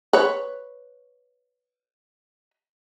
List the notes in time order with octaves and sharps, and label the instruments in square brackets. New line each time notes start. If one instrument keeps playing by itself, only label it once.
[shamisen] B4 C#5